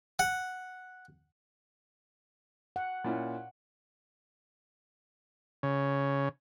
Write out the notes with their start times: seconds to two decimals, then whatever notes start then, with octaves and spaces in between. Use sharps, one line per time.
0.19 F#5
2.76 F#5
3.04 A#2 C#4 E4
5.63 C#3